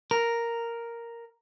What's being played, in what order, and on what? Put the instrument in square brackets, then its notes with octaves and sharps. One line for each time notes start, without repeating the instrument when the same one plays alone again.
[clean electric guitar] A#4